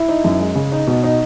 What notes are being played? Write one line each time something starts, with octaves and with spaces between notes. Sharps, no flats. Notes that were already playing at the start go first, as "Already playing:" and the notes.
Already playing: E4
D#4
F#2
G#3
C#3
D#4
B2
D#4